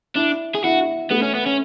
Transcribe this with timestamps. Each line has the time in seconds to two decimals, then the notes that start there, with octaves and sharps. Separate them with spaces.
0.16 D4 E4
0.55 G#4
0.64 E4 F#4
1.10 A3 B3
1.22 C#4
1.34 B3
1.46 C#4